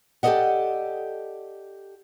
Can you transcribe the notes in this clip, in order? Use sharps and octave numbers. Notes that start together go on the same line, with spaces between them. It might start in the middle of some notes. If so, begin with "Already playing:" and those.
G4 A4 C5 D5 D#5 F#5